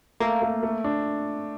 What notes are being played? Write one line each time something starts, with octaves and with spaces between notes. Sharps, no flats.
A3 A#3
A3
A3
D4